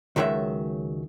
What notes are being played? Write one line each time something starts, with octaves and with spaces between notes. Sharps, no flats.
C#2 A#2 D#3 F#3 G#3 E5